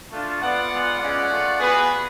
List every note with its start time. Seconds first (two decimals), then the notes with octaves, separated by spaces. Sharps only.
0.12 A3 D4 F4
0.41 B3 F4 D5 F#5
0.70 G#3 B3 F4
1.00 G#3 C#4 F4 D5 F#5
1.29 A3 F4
1.59 B3 F#4 G#4 B4